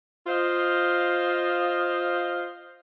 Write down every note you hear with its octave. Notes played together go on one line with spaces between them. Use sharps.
F4 C5 D#5 F5